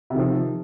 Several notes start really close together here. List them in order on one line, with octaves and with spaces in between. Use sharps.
C3 D#3 F3